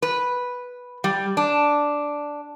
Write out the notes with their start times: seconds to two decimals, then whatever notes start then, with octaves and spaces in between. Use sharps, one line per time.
0.02 B4
1.04 G3
1.37 D4